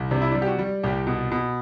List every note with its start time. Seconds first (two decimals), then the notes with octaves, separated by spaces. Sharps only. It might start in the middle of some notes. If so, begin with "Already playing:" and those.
Already playing: C2
0.11 C3 D4
0.21 E4
0.31 D4
0.35 G3
0.42 G4
0.47 F#4
0.59 G3
0.83 C2 G4
1.07 B2
1.32 B2